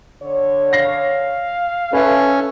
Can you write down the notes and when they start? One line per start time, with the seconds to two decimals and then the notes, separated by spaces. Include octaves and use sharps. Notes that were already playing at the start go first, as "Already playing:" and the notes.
0.23 D3 C#5
0.73 F5 A#6 C7
1.93 C#4 A4 B4 E5